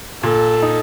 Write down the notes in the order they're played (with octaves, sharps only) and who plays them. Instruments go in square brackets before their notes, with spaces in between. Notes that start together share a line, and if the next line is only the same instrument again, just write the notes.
[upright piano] A#2 [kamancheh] A4
[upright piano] D#4